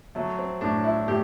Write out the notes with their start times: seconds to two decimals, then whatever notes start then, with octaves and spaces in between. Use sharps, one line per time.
0.15 F#3 A3
0.38 C4
0.61 A2 D4
0.84 E4
1.07 A2 G4